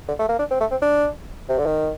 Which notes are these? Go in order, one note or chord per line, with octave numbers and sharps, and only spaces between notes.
D3
A3
A#3
D4
C4
A3
C4
D4
C3
D3
D#3